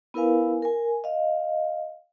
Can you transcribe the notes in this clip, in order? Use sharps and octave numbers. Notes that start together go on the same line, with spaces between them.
B3 E4 A#4 B4 F5 G#5
A#4 G#5
D#5 F5